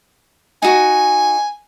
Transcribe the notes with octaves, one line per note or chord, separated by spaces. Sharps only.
D#4 F#4 G#5